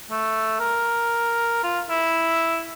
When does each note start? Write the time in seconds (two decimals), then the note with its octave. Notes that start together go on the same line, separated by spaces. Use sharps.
0.10 A3
0.59 A#4
1.63 F4
1.89 E4